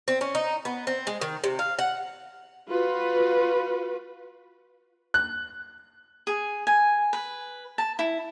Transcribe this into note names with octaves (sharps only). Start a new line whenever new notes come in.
C4
C#4
D#4
B3
C4
G#3
D#3
C3
F5
F#5
F4 F#4 B4
F#6
G#4
G#5
B4
A5
E4